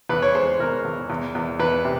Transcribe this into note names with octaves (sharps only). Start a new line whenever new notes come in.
E2 B4
C#5
G#3 C5
E2 A#4
E2
E2
E2
E2 B4
C3